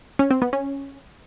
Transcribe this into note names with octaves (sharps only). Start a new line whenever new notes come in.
C#4
C4
B3
C#4